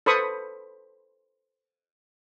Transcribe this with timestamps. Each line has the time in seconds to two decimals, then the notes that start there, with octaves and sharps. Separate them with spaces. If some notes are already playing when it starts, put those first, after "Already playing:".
0.06 A4 B4 C5 B5 C#6 D#6